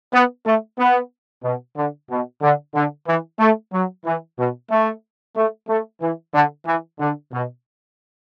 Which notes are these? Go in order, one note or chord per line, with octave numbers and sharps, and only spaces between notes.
B3
A3
B3
B2
D3
B2
D3
D3
E3
A3
F#3
E3
B2
A3
A3
A3
E3
D3
E3
D3
B2